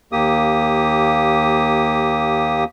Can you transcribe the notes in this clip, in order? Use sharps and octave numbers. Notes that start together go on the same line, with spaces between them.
D#2 A#3 G4 D#6